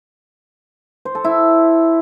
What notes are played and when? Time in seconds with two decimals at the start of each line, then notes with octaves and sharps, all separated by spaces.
1.05 C5
1.15 A4
1.24 E4